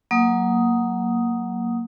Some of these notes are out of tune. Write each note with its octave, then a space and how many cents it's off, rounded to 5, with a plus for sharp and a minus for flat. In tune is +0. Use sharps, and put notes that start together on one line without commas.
F#3 +0 A#3 +0 D#6 +5